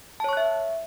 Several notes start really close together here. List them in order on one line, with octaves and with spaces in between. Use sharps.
A5 C#5 C#6 F#6 E5